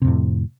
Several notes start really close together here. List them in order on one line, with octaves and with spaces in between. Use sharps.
C3 F2 A2